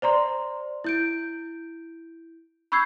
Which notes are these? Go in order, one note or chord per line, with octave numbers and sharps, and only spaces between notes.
C5 D5 A#5 C6
E4 G6 D7
B5 C#6 E6 G6 G#6 C7